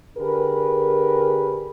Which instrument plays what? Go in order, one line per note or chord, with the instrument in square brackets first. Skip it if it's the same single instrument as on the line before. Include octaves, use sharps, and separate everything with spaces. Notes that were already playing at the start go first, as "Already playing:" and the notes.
[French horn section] D3 G4 G#4 A#4 B4